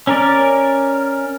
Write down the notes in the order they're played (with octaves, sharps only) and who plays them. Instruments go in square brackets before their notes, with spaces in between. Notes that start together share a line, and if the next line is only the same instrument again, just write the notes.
[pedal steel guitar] C#4 A#4 D5